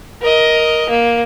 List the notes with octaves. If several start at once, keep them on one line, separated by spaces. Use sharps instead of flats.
A#4 D#5
A#3